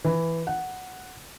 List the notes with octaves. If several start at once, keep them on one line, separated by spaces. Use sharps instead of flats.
E3
F#5